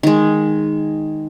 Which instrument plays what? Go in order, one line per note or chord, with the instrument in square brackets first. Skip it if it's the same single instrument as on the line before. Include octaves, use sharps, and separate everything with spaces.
[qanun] D#3 G#3